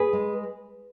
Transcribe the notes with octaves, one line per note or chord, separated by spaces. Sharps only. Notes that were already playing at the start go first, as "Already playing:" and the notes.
Already playing: G#4 B4
G#3